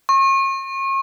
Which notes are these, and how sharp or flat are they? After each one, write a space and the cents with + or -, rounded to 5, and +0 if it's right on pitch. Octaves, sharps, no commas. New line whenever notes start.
C#6 -40